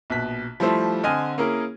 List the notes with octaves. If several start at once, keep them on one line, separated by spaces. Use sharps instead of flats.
A#1 B2 F#6 B6
F3 G3 A3 E4 C5
D3 C4 D#5 G#5 F6 D#7
A#3 C#4 E4 G#4 A#4